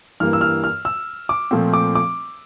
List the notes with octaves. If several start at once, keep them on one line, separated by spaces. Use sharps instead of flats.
G2 E3 G3 A#3 F6
E6
F6
F6
E6
D6
A#2 F3 A3 C4
D6
D6